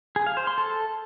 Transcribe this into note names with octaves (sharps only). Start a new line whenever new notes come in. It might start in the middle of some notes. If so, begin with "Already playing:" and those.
G#4
F5
C5
C6
A4